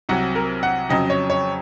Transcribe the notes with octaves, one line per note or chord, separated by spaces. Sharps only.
C2 C3 F#3 F#5
A#4
F#5
F2 C#3 F#3 D#5
C#5
C#5